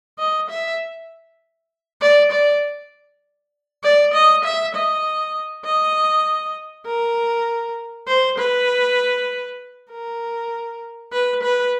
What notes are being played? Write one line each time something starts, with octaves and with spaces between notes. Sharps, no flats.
D#5
E5
D5
D5
D5
D#5
E5
D#5
D#5
A#4
C5
B4
A#4
B4
B4